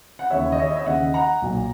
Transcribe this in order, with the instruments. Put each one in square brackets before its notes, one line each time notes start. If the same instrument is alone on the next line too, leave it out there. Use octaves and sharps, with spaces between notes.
[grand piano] F#5
D#2 C#3 E3 C#5 E5
D#5
C#5 E5
D#5
E5
D#2 C#3 E3 D#5 F#5
F#5 A#5
B1 A#2